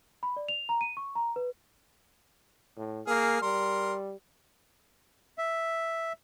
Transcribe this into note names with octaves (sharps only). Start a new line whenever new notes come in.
B5
D5
F7
A#5
D#7
C#6
A#5
B4
A2
A#3 G#4 F6
G3 A#4 C6
E5